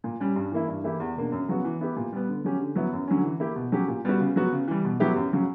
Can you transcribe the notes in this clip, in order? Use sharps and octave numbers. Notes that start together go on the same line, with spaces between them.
A#2
G3 C#4
G2
E3 A#3 E4
G2
E3 A#3 E4 G4
E2
B2 A#3 D4
F#2
C#3 F#3 B3 F#4
E3
B3 E4 G4
A#2
G3 B3
D3
F#3 C#4 G4
D3
F#3 B3 E4
F#2
D3 F#3 C#4
E3
A#3 E4 G4
B2
F#3 C#4 G4
A#2
G3 B3 F#4
C#3
F#3 B3 F#4
C#3
E3 G3
B2
F#3 B3 E4 G4
F#2
C#3 F#3